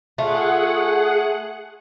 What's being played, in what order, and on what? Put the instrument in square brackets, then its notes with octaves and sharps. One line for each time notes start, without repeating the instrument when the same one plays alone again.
[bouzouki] A3 F4 [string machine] G#4 F#5